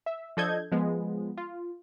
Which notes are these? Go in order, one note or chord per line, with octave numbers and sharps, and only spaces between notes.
E5
F3 D4 A4 D#5 G6 G#6
F3 G#3 B3
F4